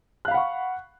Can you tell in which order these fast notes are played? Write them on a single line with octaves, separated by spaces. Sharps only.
F#6 F5 B5 F#5 C#6